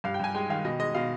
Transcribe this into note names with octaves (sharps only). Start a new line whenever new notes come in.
G2 F5
G5
G2 G#5
G#3 G5
D#3 F5
B2 D#5
G#3 D#5
B2 F5